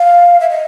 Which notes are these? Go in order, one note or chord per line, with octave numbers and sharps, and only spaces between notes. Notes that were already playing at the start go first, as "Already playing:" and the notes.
Already playing: F5
E5
D#5